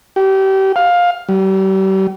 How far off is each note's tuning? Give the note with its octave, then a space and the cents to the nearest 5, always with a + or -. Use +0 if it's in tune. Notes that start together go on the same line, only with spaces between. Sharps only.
G4 -30
F5 +15
G3 -40